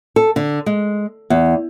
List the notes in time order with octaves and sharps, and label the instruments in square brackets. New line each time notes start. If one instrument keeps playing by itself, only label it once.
[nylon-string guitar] A4
D3
G#3
E2